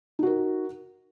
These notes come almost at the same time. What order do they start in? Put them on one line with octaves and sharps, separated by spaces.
D#4 F#4 A#4